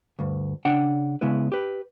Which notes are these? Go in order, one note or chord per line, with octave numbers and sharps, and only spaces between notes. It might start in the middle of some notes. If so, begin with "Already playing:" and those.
D2 G2
C#3 D4 F#5 G5
C#3 G#3 B3 E4 B4
G4 B4